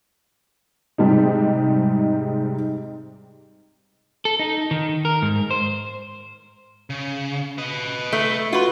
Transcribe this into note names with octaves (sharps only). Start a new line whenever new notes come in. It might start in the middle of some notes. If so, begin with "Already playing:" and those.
G#2 C3 G3 G#3 D#4
A4
D#4
D#3
A#4
G#2
C5
C#3
B4 D#5
A3
F4 F#4 B4